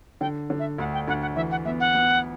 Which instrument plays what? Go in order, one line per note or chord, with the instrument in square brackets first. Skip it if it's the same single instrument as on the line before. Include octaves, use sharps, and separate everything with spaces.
[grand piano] D3 [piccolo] G5
[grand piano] D3
[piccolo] E5
[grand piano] D2 [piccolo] F#5
[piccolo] G5
[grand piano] D2 [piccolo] F#5
[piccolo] F#5
[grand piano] E3 [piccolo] E5
[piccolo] F#5
[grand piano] B3 [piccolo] E5
[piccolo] F#5
[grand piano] B3